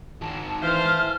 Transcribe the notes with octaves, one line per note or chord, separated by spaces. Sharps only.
G#2 D#3 A5
E3 A3 C5 F5 F6